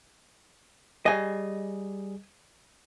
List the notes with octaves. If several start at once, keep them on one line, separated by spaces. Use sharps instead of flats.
G3 G#4 D#5 G#5